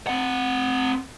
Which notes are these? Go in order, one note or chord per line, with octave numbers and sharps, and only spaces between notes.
C4 F#5